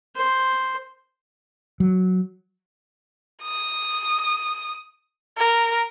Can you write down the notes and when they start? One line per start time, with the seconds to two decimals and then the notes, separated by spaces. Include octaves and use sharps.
0.16 C5
1.80 F#3
3.43 D#6
5.38 A#4